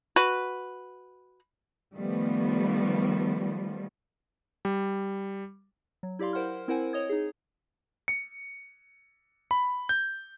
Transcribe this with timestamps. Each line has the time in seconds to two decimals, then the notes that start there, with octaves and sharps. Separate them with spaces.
0.16 F#4 B4
1.97 D#3 F3 G3 A3 B3
4.65 G3
6.03 F#3
6.19 E4 G4 D5 F5 C6
6.33 A#4 C5 F#5 C6 F6
6.68 C4 E4 A#4 C5 F#5 G#5
6.93 C#5 D#5 D#6 G#6
7.09 D#4 G#4
8.08 C#7
9.51 B5
9.89 G6